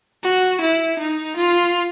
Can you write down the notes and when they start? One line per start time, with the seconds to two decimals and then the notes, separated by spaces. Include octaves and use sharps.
0.24 F#4
0.61 E4
0.99 D#4
1.36 F4